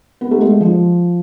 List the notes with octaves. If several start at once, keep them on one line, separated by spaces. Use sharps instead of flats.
B3
A3
G#3
F3